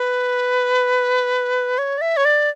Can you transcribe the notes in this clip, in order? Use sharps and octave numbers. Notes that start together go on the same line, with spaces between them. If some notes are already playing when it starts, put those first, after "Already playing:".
Already playing: B4
C#5
D5
E5
C#5
D5